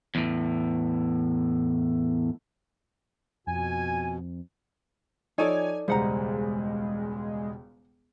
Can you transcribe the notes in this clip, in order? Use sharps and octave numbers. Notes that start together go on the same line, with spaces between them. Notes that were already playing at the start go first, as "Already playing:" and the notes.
E2 A2
F2 B2 G#5
F3 D#4 A4 C#5 D5 G#5 D#7
E1 C#2 G3 G#3 C5 F#5 A#5